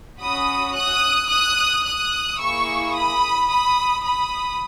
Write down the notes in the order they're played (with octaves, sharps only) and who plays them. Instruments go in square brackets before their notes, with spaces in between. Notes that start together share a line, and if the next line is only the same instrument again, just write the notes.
[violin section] C#4 F#4 B5 D#6
D#6 F#6
D#6 F#6
D#6 F#6
A#3 E4 G#4 C#6 E6
B5 D#6
B5 D#6
B5 D#6